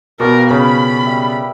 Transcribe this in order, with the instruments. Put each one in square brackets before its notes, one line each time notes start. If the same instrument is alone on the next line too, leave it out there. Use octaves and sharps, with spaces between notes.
[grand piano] B2 [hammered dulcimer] F3 G3 D6 [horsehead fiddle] A#4
[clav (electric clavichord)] C#3 [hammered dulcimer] A#4 B4 [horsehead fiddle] B5
[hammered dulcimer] G3 E5